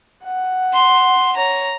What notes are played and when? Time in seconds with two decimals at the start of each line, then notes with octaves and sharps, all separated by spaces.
0.24 F#5
0.73 C6
1.36 C#5 A#5